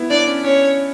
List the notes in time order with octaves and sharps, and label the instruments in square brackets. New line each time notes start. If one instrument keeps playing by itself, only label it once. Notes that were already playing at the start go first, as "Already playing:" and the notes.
Already playing: [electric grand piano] B3 E4
[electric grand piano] D4 [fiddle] D5
[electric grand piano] C#4
[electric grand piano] C#4 [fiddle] C#5